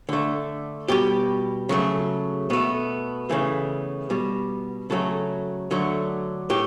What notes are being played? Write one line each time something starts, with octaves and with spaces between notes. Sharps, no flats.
D3 A3
B2 G3 G4
C#3 F#3 A3
B2 A3 B3
C#3 E3 A3
B2 G3
C#3 F#3 A3 A4
D3 F#3 A3
A2 G4